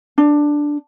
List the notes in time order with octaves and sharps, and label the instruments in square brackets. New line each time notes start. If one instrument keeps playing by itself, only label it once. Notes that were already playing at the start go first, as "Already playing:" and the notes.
[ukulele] D4